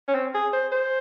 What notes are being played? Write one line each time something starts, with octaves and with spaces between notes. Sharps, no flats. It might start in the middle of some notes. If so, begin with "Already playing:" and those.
C#4
C4
G#4
C5
C5